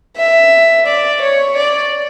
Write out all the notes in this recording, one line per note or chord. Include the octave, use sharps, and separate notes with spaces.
E5
D5
C#5
D5